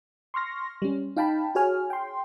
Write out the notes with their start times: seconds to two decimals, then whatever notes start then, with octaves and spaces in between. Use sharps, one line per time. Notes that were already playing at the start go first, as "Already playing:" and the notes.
0.34 C6 C#6 F6 A#6
0.82 G3 C#4
1.17 D#4 F5 G5 A5 B5
1.55 F#4 G#4 C#5 G#5 F6
1.90 G5 C6